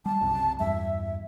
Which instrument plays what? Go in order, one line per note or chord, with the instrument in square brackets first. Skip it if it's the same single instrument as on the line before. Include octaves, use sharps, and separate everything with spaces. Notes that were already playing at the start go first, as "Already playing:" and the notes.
[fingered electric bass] G3 [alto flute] A5
[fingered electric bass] F#1 C2 C3
[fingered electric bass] E2 G2 G3 [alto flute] E5